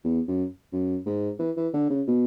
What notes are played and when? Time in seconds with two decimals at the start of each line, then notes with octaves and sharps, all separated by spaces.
0.04 E2
0.28 F#2
0.73 F#2
1.06 G#2
1.39 E3
1.57 E3
1.74 D3
1.90 C#3
2.07 B2